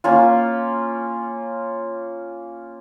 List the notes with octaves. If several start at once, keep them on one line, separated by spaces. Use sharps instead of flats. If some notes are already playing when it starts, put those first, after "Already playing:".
A#3 C#4 F4